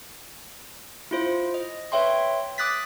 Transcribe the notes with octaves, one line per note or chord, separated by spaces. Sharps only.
E4 F4 C5
D#5
B4 C#5 E5 G5 C6
D6 D#6 F#6 A6 B6